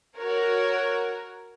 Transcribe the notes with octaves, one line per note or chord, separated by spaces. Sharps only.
F#4 A#4 C#5